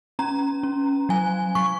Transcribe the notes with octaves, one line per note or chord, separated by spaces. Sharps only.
C#4 A#5
C#4
F#3 G#5
F#3 C#6